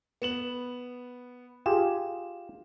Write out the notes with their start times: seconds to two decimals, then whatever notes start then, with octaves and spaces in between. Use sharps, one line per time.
0.22 B3 E7 F#7
1.66 F4 G4 G#4 E7